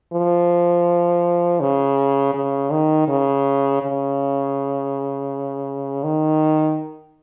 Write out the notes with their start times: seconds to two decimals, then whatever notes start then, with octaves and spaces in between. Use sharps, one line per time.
0.13 F3
1.60 C#3
2.34 C#3
2.71 D#3
3.08 C#3
3.82 C#3
6.03 D#3